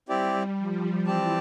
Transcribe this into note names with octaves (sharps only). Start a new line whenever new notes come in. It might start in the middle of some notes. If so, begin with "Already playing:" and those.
G3 C4 E4 G4 D5
F3
E3 C4 G4 D5 A5